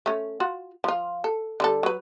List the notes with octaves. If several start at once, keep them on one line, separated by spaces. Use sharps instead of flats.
A3 C#4
F4 F#4
F3 F4
A4
D3 G3 A4
F#3 B4